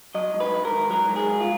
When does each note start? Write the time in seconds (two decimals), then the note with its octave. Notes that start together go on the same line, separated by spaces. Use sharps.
0.15 F#3 D#5
0.33 G#2
0.40 B4
0.52 G#2
0.65 A#4
0.72 D#3
0.90 F#3 A#4
1.09 G#2
1.16 G#4
1.28 G#2
1.41 F4